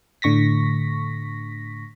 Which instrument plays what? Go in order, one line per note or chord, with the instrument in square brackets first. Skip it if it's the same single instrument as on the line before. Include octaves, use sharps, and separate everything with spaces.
[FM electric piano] A2 D3 C#6 A#6 B6